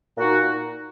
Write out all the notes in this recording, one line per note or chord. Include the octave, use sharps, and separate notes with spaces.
A#2 A#3 D#4 F#4